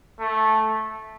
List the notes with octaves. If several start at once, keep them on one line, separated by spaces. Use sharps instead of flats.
A3